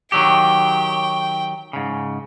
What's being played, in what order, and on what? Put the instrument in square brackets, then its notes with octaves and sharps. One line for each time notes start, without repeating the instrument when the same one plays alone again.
[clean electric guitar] D#3 F#3 G4 [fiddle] G5
[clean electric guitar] G#2 C#3